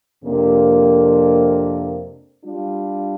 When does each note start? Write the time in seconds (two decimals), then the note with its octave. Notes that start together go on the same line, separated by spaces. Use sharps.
0.22 F2 C3 A#3 D4
2.45 G3 D4 F4